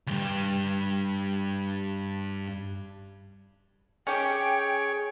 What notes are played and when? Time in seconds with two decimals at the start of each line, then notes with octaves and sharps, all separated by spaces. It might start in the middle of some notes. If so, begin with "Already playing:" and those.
0.07 D2 G2
4.07 C#4 G4 G#4 C#5 G5